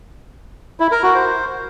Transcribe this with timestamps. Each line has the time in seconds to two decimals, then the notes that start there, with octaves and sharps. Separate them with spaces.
0.80 E4
0.91 A#4
1.03 F#4
1.14 C5